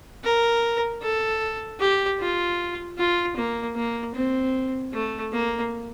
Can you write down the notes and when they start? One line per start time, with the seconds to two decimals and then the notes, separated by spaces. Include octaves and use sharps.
0.24 A#4
1.02 A4
1.80 G4
2.20 F4
2.98 F4
3.37 A#3
3.76 A#3
4.14 C4
4.93 A3
5.32 A#3